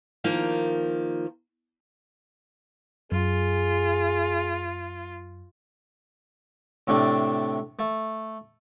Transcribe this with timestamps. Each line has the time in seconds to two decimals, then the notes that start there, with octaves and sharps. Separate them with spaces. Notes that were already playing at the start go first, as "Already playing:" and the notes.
0.24 D#3 F3 A#3
3.12 F#2 F4 G#4
6.87 A2 C3 A3 D4
7.79 A3